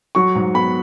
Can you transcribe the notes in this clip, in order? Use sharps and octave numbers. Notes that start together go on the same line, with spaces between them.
F#3 C#6
G#2
B3 B5